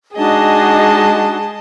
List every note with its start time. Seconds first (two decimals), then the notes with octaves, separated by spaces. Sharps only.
0.17 G#3 D4 D#4 F#4 G#4 D#5 A5